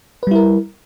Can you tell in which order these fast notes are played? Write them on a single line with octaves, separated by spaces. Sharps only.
B4 G3 E4 A#4